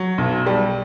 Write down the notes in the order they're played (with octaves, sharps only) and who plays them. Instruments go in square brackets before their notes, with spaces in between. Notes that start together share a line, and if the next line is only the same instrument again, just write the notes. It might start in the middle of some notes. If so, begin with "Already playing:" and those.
Already playing: [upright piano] F#3
B1
G3